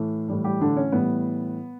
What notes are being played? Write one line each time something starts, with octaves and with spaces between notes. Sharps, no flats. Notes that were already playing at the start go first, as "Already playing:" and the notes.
Already playing: A2 E3 A3
A2 E3 G3
G3 G4
D3 D4
C#4
A2 E3 G3 B3